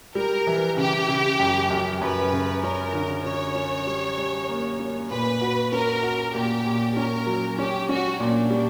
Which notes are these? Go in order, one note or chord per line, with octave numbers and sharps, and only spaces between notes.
G3 A#4
E3
C#3 G4
C#3
F#2
F#2
F#2 B4
C#3
C#4 A#4
D3
C#4 C#5
C#4
G3
G3
A#3
C#4
A#2 B4
F#4
C#4 A#4
F#4
A#2 G4
A#2
C#4 A#4
F#3
C#4 G4
C#4 F#4
A#2 D4
G3